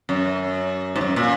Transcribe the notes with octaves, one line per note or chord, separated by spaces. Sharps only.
F#2
G#2
F#2
A#2